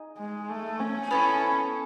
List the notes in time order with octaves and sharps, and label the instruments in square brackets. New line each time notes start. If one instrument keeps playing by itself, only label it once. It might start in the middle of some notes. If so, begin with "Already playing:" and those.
Already playing: [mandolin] D#4 G#4 D#5
[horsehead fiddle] G#3
A3
C#4
[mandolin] B3 E4 A4 [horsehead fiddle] C#4